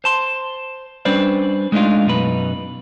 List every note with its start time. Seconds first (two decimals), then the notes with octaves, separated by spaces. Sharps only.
0.04 C5 A5 C6
1.05 G3 C#4 D4 B4 C5 D5
1.72 G#3 A3 D4 D#4 F4
2.06 F#2 B2 D#4 B4